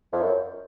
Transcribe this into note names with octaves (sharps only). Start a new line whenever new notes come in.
F2
F#2